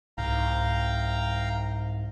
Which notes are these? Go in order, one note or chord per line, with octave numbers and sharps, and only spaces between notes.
C2 G#2 F5 G5 A#5